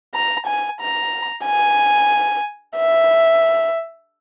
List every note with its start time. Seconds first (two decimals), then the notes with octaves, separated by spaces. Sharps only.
0.15 A#5
0.46 G#5
0.81 A#5
1.46 G#5
2.77 E5